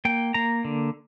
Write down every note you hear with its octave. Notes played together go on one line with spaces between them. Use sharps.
A#3 G5
A#3 A#5
D3